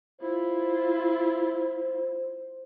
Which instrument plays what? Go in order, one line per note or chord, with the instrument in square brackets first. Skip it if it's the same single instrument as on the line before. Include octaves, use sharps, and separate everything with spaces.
[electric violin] E4 F4 [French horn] C5